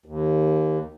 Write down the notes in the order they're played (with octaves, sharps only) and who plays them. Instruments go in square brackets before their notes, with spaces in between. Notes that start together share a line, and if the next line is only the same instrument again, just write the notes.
[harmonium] D#2